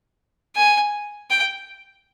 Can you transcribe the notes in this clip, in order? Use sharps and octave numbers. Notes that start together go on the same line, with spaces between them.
G#5
G5